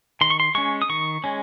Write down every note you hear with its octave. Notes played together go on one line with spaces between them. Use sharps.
D#3 C6
C#6
C6
G#3 C#4 C#6
D#6
D#3 C#6
G#3 C#4